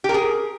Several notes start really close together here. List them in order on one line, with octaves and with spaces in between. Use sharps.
G4 A#4 G#4